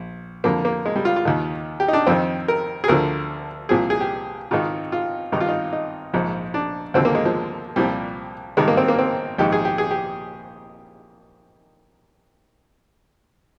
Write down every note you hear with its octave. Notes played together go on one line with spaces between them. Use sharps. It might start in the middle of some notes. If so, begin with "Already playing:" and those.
Already playing: A#1
F2 D3 F3 A#3
A#3
G#3
G3
F4
F4
D#2 D#3
G4
D#4
D4
F2 D#3 C4
A#4
G#4
D2 D3 F3 A#4
C2 A#2 F3 G#4
G#4
G4
G#1 G#2 D#3 F4
F4
G#1 G2 D#3 D#4
F4
D#4
D#4
A#1 G#2 F3
D4
D#2 D3 F3 C4
A#3
G#3
F3
C2 A#2 F3 G3
G#1 G2 D#3 G#3
A#3
C4
A#3
C4
A#1 G#2 D#3 G4
G#4
G4
G#4
G4